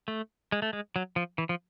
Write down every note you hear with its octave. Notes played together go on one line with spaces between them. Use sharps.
A3
G#3
A3
G#3
F#3
F3
E3
F3